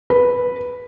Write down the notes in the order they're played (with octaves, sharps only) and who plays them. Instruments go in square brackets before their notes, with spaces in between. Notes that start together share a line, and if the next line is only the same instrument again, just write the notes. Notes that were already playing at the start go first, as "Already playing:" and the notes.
[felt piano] B4